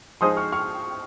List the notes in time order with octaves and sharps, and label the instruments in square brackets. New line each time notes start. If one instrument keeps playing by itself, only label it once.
[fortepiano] F3 G#3 D#4 G#4 C5 [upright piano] C6 D#6
[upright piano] C#6 F6
C#6 F6